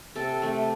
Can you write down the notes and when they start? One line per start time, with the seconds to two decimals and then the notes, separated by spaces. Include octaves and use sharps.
0.15 C3 A4
0.42 A3 C4